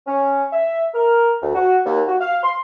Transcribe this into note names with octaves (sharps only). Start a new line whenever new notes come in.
C#4
E5
A#4
D2
F#4
D#2
F#4
F5
C6